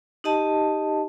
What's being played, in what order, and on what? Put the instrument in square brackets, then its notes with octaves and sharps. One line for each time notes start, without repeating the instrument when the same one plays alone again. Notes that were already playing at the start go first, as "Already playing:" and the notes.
[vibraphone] D#4 G4 D#5 A5